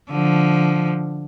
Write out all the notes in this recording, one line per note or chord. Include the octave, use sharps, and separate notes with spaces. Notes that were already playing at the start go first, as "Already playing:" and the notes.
D3 F3